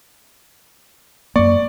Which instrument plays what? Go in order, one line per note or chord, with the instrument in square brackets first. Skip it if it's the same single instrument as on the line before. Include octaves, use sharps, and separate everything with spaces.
[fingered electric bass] F#2 A#3 [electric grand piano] D5 C#6